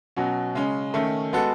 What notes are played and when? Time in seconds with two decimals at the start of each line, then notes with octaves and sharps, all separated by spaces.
0.16 B2 F#3 C#4 F#4
0.55 C#3 G#3 C#4
0.94 D#3 A3 C#4
1.33 G#3 B3 F#4 A4